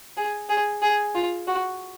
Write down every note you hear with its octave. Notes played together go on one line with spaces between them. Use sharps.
G#4
G#4
G#4
F4
F#4